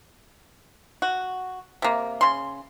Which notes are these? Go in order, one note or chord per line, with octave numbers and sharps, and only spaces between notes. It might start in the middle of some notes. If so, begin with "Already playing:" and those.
F#4
C3 A#3
C#3 C6